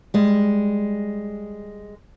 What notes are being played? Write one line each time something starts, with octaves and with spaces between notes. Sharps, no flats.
G3 G#3